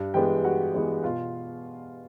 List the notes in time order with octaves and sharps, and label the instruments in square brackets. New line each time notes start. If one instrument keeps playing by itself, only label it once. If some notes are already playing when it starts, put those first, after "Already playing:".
Already playing: [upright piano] G2
E3 G#3 B3 G4 G5
G2 F#4 F#5
E3 G#3 B3
B2 F4 F5